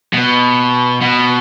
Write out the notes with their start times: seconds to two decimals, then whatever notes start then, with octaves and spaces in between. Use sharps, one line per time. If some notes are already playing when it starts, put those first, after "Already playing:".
0.13 B2
1.02 B2